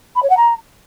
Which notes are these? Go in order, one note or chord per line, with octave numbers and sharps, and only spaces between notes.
B5
C#5
F#5
A#5